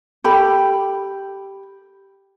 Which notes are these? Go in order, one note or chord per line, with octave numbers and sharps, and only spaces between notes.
G4 A4 B5